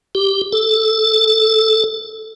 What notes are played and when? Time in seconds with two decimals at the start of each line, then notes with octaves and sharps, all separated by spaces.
0.15 G4
0.52 A4